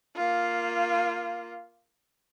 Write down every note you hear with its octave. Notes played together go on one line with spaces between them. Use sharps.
A#3 F4